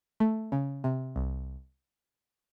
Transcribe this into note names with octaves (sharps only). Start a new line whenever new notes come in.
A3
C#3
C3
C2